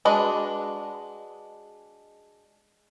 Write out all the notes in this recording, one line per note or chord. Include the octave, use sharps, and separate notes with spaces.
G#3 D4 F#4 B4 D#5